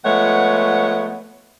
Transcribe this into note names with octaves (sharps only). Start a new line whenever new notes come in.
F3 G#3 A3 B3 C#5 F#5